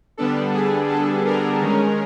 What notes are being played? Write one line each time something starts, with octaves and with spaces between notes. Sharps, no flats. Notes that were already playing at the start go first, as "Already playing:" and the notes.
D3 G3 B3 D4 A4
G#4
A4
A#4
D#3 G#3 C#4